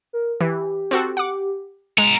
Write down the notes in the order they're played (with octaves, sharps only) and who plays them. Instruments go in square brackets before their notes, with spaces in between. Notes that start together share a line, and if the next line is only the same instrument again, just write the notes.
[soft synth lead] A#4
[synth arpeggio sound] E3 [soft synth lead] G4
[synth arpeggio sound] C4 F#4 A4
F#5 D6
[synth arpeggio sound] G#3 [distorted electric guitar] B3 A#5